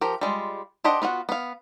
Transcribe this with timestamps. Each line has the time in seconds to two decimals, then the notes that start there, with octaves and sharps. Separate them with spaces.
0.01 F3 G4 A#4
0.21 G3 G#3 F4
0.84 D4 G4 C5 D#5 F#5
1.02 B3 F4 F#4 F#5
1.29 B3 F5